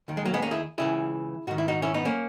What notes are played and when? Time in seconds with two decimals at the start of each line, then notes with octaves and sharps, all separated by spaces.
0.08 D#2 D#3
0.17 G#3
0.25 F#3 A#3
0.34 G#3 B3
0.42 A#3 C#4
0.51 E4 G#4
0.78 C#2 C#3 E3 E4 G#4
1.47 G#2 D#3 F#4
1.58 E4
1.68 D#4 F#4
1.82 C#4 E4
1.94 B3 D#4
2.05 A#3 C#4